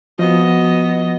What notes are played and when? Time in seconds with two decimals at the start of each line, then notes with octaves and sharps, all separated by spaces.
0.19 F3 B3 F#4 D#5